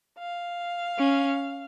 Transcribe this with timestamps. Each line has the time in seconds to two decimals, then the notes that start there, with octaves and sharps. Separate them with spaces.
0.19 F5
0.99 C#4